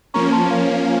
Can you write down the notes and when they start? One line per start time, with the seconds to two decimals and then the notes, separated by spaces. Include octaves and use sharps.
0.14 F3 A#3 C#4 A#5 C#6
0.32 A5 C6
0.50 F5
0.69 F5